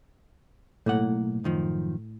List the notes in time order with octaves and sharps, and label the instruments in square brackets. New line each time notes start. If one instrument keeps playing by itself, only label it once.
[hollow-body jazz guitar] B1 A#3 F#5 [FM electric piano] A2
[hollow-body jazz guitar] F#2 D#3 F3